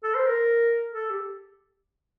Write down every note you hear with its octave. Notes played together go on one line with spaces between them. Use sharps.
A4
C5
A#4
A4
G4